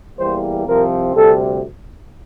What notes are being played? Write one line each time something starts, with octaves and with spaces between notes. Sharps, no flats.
E2 E3 G3 A#3 C5
C2 C3 F3 C4 A#4
D2 C3 G3 A4